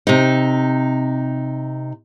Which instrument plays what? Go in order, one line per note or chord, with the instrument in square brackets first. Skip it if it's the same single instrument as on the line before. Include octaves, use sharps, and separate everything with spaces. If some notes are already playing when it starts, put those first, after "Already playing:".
[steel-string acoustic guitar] C3 D#4